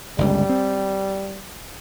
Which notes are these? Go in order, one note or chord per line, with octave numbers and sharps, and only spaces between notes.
G1 C#2 G3
C4